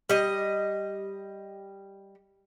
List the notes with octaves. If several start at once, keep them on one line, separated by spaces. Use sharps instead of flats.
G3 D#5